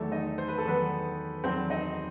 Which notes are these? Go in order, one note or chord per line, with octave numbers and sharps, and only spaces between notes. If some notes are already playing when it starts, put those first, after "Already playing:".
Already playing: E2 D#3 F#3 A3 A4
D#4 D#5
C5
B4
A4
E2 D#3 F#3 B3 B4
E2 D#3 F#3 C4 C5
D#4 D#5